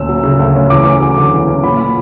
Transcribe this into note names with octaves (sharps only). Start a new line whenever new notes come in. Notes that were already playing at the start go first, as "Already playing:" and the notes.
Already playing: D2 A#2 C#4 E6
F#3
C#3
D2
C#4
E2 D6
C#4
F#3
D3
E2
C#4
A#2 B5
A#2